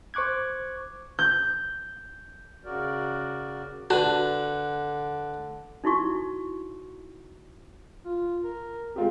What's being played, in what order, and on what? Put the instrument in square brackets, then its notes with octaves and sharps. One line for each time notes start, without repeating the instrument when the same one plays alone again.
[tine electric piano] C5 C#6 D6 F#6 G#6
[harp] G6
[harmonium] C#3 F#4 A#4 D5
[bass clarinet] D3 [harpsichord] D4 B4 [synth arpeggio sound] F#4 A5
[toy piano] D#4 E4 F#4 C#6
[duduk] F4
A#4
[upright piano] G#3 F4 G4 [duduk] C4